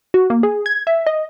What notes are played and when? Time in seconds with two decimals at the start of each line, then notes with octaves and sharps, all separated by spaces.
0.14 F#4
0.30 A#3
0.43 G#4
0.66 G#6
0.87 E5
1.07 D#5